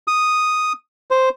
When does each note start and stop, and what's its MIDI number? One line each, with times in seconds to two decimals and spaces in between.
0.08 0.73 87
1.11 1.29 72